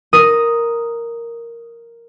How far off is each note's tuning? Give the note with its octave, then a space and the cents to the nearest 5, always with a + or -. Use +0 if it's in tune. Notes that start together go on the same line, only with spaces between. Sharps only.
A#4 +0 D#6 +0